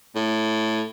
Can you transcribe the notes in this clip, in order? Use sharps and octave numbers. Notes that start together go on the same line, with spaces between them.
A2